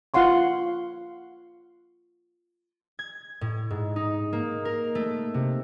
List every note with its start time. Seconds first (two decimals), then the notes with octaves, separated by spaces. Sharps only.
0.14 F4 F5 F#5 C6 C#6
2.99 G#6
3.41 A2
3.71 G#2
3.96 D#4
4.33 A#3
4.65 A#4
4.95 A3
5.34 C3